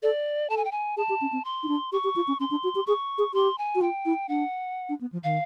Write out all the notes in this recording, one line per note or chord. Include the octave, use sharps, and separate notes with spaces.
A4 D5
A4 A5
G#5
G5
G#5
G#4 A5
G4
C#4
C4
C6
D#4
D4
G4 C#6
G4
F4
C#4
C#4 C6
D4
F#4
G4
G#4 C#6
G#4
G4 C6
G#5
F#4
F4 G5
E4
D4 F#5
D4
B3
F3
D#3 F5